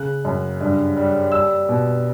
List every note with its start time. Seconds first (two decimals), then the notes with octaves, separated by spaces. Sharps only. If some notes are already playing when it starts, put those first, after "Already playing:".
Already playing: C#3 F#6
0.25 F#2
0.61 G2
0.97 G3
1.32 G3 E6
1.69 B2